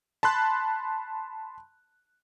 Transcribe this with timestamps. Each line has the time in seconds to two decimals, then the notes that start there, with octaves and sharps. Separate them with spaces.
0.23 A5 B5 C6 F#6